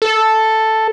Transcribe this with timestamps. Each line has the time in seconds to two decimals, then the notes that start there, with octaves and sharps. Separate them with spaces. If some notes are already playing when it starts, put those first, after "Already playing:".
0.02 A4